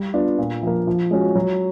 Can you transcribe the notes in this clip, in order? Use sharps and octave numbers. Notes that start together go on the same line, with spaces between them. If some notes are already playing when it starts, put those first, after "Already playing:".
Already playing: G3
B3 D4 F4
A#2
F3 A#3
F3
G#3 C#4 F#4
F#3